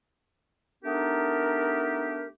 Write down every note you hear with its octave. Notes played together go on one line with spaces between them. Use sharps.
A3 B3 D4 D#4 G4 A#4